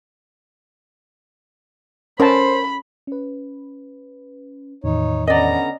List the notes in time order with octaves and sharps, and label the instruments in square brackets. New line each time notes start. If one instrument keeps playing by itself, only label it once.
[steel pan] C#4 A5 [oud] A#4 [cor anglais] C5 [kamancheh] B5
[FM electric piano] C#4 B4
[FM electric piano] E2 A2 D#3 [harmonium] D#4 C#5
[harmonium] D3 B3 [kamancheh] C#4 A#5 [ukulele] D5 D#5